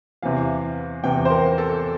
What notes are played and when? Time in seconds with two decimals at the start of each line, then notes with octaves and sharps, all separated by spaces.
0.22 E2 C3 E3 F5
1.03 E2 C3 E3 G5
1.25 C5
1.30 A#4
1.58 A4